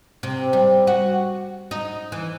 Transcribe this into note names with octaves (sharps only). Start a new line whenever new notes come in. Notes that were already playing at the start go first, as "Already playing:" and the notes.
C3
G3
F#4
D#4
E3